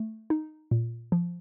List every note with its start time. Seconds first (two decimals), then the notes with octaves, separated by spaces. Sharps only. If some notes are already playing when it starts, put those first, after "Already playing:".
Already playing: A3
0.30 D#4
0.71 A#2
1.12 F3